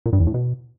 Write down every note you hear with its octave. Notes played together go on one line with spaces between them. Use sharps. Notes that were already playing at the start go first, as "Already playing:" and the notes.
A#2
G2
E2
A2
B2